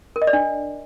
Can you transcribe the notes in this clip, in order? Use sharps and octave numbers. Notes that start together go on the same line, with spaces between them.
A#4
D#5
D5
D4